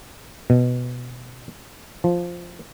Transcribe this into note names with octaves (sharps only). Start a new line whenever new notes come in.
B2
F3